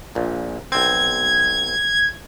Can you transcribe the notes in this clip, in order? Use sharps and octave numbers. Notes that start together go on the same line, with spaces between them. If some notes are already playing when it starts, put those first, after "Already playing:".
A#1 A#2
B1 C4 G#6